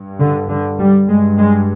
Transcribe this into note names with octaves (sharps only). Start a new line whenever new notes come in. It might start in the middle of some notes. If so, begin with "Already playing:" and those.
Already playing: G2
D3
D3
G3
G2 G#3
G#3